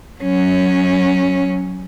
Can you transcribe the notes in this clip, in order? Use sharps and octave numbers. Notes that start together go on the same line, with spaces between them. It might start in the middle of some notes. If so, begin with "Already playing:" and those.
F#3 C#4